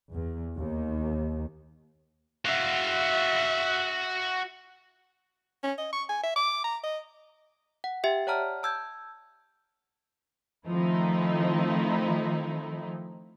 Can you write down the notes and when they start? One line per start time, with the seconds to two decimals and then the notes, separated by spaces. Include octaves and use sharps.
0.13 E2
0.57 D#2
2.46 F#4 E5 F5
5.63 C#4
5.78 D#5
5.93 C#6
6.09 G#5
6.23 E5
6.36 D6
6.64 A#5
6.84 D#5
7.84 F#5
8.04 G4 E5 G5
8.27 C#5 D5 F#5 A5 A#5 F6
8.63 A5 E6 G6 G#6
10.68 D#3 F3 A3 C4 D#4 E4